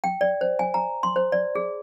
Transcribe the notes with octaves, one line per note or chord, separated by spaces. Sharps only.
G5
D5
C5
G#5
A#5
C6
C5
D5
G#4